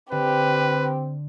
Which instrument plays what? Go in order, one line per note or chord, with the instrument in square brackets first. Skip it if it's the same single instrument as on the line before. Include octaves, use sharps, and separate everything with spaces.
[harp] D3 [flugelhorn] C4 [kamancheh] G4 [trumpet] B4